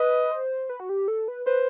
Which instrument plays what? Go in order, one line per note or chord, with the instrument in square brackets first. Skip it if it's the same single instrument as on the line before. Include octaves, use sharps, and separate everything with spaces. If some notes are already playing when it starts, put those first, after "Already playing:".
Already playing: [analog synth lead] B4 [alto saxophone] D#5
[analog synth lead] C5
B4
F#4
G4
A4
B4
[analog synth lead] B4 [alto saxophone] C5